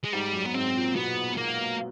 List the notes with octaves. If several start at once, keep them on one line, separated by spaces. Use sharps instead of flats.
G#3
G#2 G3
F#2
B3
G#2 C4
A#2
B2 B3
A#3